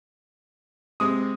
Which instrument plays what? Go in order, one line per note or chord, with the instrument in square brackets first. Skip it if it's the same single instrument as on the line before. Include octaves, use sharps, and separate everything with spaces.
[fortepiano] C3 G#3 C4 [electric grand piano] D#6